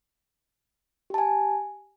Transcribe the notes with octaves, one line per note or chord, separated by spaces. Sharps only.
G4 G#5 A5